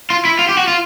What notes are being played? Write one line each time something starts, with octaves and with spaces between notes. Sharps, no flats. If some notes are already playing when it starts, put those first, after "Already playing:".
F4
E4
F4
G4
F#4
F4